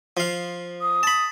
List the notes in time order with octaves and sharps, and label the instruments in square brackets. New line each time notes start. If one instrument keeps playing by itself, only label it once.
[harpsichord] F3 F5
[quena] D#6
[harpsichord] A5 B5